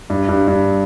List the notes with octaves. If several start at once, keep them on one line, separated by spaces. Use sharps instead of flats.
G2
G2
G2